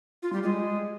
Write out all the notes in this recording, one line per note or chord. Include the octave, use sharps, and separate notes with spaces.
F4
G3
G#3